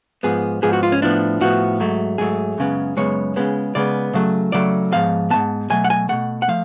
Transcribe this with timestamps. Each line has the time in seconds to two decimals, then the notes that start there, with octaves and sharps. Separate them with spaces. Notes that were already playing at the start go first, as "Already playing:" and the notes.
0.23 G#2 F3 B3 G#4
0.62 G#2 F3 B3 G#4
0.73 F#4
0.83 F4
0.92 C#4
1.02 A2 F3 B3 D4
1.41 A2 F3 B3 F#4
1.80 G#2 F#3 A3
2.18 G#2 F#3 A3 G#4
2.58 F#2 C#3 G#3 B3
2.97 F#2 C#3 G#3 B3 C#5
3.36 C#3 G#3 B3
3.75 C#3 G#3 B3 D5
4.14 C#3 F#3 A3
4.52 C#3 F#3 A3 D5
4.92 G#2 F3 B3 F5
5.30 G#2 F3 B3 A5
5.70 B2 F#3 A3 G#5
5.84 F#5
5.90 G#5
6.09 B2 F#3 A3 F#5
6.42 F#5
6.48 F3 A3 F5